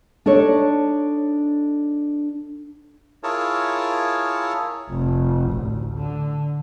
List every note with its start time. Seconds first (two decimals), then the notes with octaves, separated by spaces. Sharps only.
0.26 D4 D#4 A4 C#5
3.23 E4 F4 G#4 A#4 C#5 A5
4.88 F1
5.50 A1 D2
5.96 D3